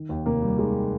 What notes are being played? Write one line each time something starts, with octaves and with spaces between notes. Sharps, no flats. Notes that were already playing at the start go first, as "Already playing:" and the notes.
Already playing: D#3
D#2
F1 A#3
G3
D#3 G#3